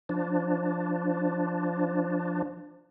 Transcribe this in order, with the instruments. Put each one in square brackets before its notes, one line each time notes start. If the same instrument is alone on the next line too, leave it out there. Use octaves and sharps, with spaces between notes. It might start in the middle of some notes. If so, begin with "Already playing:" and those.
[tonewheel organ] F3 D4